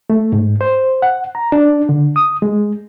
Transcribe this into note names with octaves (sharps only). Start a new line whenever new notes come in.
A3
G#2
C5
F#5
A#5
D4
D3
D#6
G#3